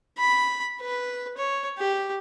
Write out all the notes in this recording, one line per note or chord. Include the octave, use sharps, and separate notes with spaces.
B5
B4
C#5
G4